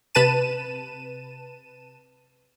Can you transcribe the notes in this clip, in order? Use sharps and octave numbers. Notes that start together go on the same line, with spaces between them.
C3 B4 A5 D#7 E7